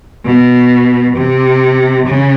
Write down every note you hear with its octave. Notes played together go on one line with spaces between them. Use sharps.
B2
C3
C#3